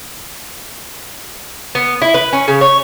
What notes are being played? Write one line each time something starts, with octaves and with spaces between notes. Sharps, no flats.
B3
E4
B4
C#4
C#3
C#5